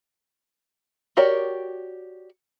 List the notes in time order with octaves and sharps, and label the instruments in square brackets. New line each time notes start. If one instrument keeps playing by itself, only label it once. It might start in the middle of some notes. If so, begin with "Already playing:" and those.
[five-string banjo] F#4 G4 A#4 C#5 D5